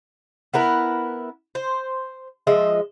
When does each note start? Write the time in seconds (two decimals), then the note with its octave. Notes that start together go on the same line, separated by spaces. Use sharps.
0.53 B3 E4 A#4 B4
1.55 C5
2.47 F3 G#3 D#5 E5